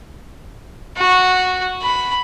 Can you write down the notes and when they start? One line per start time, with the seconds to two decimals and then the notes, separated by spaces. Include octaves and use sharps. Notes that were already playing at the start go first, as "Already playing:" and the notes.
0.97 F#4
1.82 B5